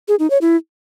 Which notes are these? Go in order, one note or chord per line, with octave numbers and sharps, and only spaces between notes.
G#4
D#4
C#5
E4